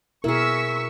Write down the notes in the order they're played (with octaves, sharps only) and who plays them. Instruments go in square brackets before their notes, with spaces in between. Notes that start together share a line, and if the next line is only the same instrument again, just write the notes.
[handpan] B2 A#4 [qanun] E4 G#4 [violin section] C#6 E6 B6